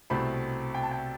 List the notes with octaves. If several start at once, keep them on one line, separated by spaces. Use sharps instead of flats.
C2 B2 A3 C4 B5
G5
A5
G5